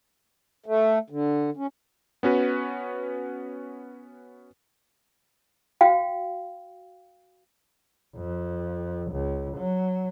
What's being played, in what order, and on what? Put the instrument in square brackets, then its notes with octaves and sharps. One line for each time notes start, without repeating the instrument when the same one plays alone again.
[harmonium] A3
D3
C#4
[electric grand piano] B3 C#4 F#4 B4
[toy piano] F#4 F5 G5
[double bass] F2
C#2
F#3